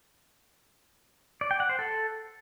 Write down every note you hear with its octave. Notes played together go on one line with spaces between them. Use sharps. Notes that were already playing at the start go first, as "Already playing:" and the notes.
D5
G5
F#5
C5
A4